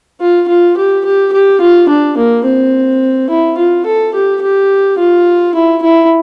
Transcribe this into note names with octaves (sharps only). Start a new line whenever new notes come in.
F4
F4
G4
G4
G4
F4
D4
A#3
C4
E4
F4
A4
G4
G4
F4
E4
E4